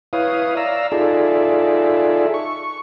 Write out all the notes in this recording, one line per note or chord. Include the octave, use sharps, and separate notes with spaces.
E4 B4 C#5 F5 D#6
D5 F5 A#5 E6
D#4 F4 G#4 A4 D5 E5
C#6